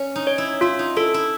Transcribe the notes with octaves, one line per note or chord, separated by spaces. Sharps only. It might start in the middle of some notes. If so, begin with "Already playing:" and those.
Already playing: C#4
D#4
C#5
E4
E4 F4
D#4
E4 A4
E4